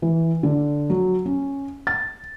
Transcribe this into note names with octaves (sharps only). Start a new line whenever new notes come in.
E3
D3
F#3
C#4
A6